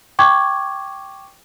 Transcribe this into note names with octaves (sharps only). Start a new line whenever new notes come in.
G5 C#6 D6 G#6